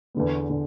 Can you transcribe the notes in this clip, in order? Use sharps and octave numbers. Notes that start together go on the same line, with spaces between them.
E2 D3 B3
D3